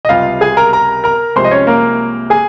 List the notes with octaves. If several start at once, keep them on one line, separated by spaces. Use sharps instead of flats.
D#5
C#2 C3 G3 F4 F5
G#4 G#5
A#4 A#5
A#4 A#5
A#4 A#5
C2 C3 F3 G#3 C5 C6
D#5
C#4 C#5
A#3 A#4
G#4 G#5